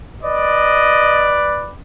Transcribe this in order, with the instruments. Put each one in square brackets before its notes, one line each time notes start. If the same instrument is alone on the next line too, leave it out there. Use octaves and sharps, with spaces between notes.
[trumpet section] B4 D5 [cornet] D#5